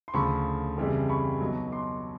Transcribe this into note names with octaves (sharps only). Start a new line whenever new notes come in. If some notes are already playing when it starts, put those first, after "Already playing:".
C6
D2 C#3 F3 B5 C#6
F2 C#3 E3 G3
B5 C#6
B1 B2 F#3
C6 D6